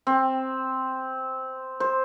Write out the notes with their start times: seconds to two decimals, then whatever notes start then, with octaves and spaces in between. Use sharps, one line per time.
0.07 C4
1.80 C5